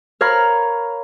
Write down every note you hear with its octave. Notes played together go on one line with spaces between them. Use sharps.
A#4 C#5 F5 B5 F6